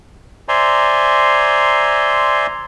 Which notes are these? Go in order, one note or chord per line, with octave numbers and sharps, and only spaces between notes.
C5 D5 E5 G#5 A#5 C6